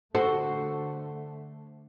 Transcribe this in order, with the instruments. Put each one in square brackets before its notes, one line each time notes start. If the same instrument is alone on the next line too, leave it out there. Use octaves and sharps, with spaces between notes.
[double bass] D3 A3 [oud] F#4 [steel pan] A4 [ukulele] C5